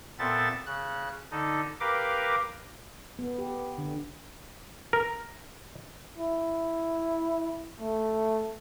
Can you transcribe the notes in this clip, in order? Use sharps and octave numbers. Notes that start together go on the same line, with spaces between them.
A#2 B3 C4 A4 E5 A6
C#3 F#6
D3 D#4 A4
G4 A#4 B4 F5 A#5 D6
B3
G4
D3
A#4
E4
A3